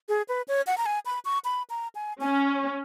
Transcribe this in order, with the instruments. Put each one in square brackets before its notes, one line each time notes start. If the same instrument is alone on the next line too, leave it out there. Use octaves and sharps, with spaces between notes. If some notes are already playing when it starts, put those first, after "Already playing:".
[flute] G#4
B4
C#5
F#5
A#5
G#5
B5
C#6
B5
A#5
G#5
[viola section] C#4 [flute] G#5